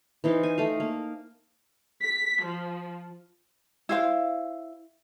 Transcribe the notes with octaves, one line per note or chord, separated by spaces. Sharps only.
E3 D#4 C5 F5
G#5
A3 D#5 F5
A#3
B6
F3
E4 C5 F5